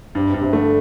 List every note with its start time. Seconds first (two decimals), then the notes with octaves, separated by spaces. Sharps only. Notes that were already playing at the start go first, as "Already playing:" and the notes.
0.15 G2 C3
0.29 B2
0.34 G2
0.41 C3
0.53 D3 A3